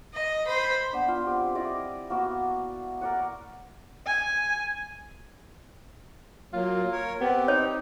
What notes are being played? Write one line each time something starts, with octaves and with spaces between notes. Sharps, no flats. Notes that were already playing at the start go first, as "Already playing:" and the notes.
D#5
C5 B5
B3 D4
F4
C4 G4
E4 D5 D#5 D6
A#3 B3 F#4 E6
A#4 D5 F#5
G#5
F#3 A#3 F4
A#4 C#5
B3 C4 G4
D#4 C#5